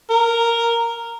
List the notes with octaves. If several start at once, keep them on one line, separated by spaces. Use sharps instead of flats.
A#4